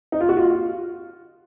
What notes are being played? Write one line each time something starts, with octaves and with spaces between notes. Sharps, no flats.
D#4
F4
F#4
F4